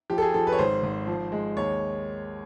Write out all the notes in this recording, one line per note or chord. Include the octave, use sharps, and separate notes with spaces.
F3 G4
A4
G#4
F3 A4
B4
C#5
G#1 C5
G#1
F3
G#3
D#2 C#5